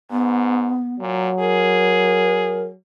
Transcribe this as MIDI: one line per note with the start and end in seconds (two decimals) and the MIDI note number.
0.11 0.77 44
0.11 0.95 59
1.00 1.30 46
1.00 2.75 54
1.39 2.70 68
1.39 2.63 70